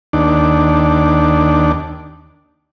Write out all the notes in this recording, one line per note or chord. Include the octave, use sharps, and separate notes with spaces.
D#2 D4